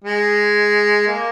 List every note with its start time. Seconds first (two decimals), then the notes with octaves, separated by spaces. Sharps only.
0.04 G#3
1.08 A#3